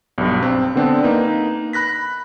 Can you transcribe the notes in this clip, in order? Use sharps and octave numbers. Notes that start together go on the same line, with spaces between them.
B1 G2
C4
D3 B3 C4 D4
A#3 D#4 B4
B5 F#6 A#6 B6